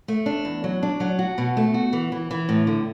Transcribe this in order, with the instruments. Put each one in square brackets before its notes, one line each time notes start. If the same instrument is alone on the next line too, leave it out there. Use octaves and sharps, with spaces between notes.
[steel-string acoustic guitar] A3
D4
E2
F#3
D4
F#3
F#4
B2
A3
F#4
E3
E3
E3
A2
D3